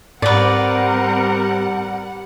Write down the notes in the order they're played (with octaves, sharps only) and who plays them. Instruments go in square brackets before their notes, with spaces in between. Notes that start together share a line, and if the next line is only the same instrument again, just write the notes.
[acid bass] G#2 [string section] G3 F#5 [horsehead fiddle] C4 A#4 [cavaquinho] B4 D5